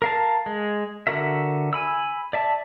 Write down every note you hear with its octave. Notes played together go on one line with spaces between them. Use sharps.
A#4 F5 A5
G#3
D3 F#4 A#4 E5
G#5 B5 E6
D5 E5 A5